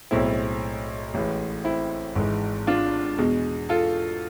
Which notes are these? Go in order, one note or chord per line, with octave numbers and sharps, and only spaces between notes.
B1 A2 G#3 C4 E4
A1 A2 E3 G#3
C4 E4
G#1 G#2 E3 G#3
D4 F4
E2 B2 G#3
F4 A4